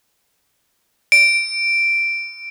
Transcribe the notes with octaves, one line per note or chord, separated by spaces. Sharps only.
D7